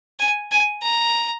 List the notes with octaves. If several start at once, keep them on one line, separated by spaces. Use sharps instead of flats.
G#5
G#5
A#5